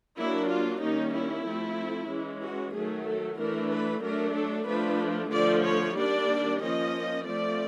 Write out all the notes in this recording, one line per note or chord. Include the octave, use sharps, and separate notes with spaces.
F#3 A#3 D4 E4
F4
D#3 G3 A#3 C#4 D#4
E4
F3 A3 C4
E3 G#3 C#4
F#4
D#3 F#3 A3 G#4
A4
E3 A3 D4 A#4
B4
F#3 A3 D4 A#4
A4
F3 A3 D4 B4
D3 F3 A3 D5
C#5
D#3 G3 A#3 D4 D5
F3 A#3 C#4 D#5
F3 A3 C4 D5